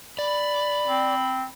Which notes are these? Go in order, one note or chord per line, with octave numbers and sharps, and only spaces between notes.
D5 B5
C4